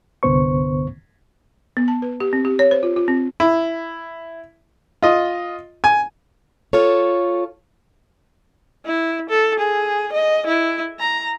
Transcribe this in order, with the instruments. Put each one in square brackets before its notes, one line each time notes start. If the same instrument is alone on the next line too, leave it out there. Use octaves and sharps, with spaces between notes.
[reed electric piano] C2 G2 D3 B3 C5 C#6
[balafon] B3
A5
B4
G4
C4
G4
C#5
C5
F4
F4
C4
[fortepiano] E4
F4 D#5
G#5
[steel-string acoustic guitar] F4 A4 C#5
[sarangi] E4
A4
G#4
D#5
E4
A#5